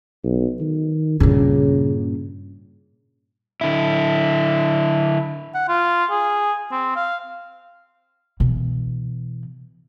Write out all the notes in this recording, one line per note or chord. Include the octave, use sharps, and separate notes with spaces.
B1
D#3
G2 A#2 C#3
D3 E4
F#5
F4
G#4
C4
F5
B2 E3